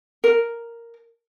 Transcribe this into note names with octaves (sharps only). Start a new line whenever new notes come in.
A#4